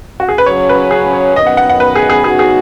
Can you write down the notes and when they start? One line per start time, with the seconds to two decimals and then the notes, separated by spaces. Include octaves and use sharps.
0.20 F#4
0.29 G#4
0.38 B4
0.46 C#3 F#3 C#4 C#5
0.69 B4
0.91 G#4
1.13 C#5
1.35 F#2 D#3 B3 D#5
1.47 F#5
1.57 F#5
1.69 F#5
1.80 B4
1.96 G#4
2.10 G#4
2.24 C#3 B3 D#4 F#4 G#4
2.39 G#4